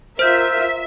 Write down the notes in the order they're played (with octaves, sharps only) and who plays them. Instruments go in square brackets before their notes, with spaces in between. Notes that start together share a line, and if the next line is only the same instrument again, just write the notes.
[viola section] F4 A#4 [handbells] C5 [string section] E5 [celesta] F6 G6